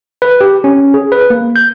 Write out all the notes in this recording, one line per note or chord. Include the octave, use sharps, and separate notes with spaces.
B4
G4
C#4
G#4
B4
A#3
G6